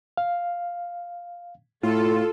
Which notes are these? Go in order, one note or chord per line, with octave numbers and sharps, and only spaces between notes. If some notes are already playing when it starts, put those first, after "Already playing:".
F5
A2 F4 A4